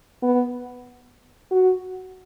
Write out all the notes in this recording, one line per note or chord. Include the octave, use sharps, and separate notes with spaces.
B3
F#4